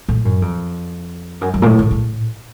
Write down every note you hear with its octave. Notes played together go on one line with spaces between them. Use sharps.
A2
F#2
F2
F#2
F#2
A#2
A2
C#3
A2